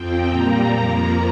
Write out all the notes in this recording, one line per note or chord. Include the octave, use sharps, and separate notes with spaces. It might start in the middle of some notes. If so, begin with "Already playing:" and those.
Already playing: F2 F3 C4 G5
A#2 G3 A#3 A#5
F2 F3 A#3